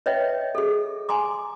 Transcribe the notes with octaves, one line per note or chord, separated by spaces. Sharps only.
B4 C#5 D#5 E5 G5
G#4 A4
G#5 A#5 C6 D6